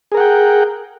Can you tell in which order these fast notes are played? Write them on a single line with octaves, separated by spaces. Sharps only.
G#4 A#4 F#5 G5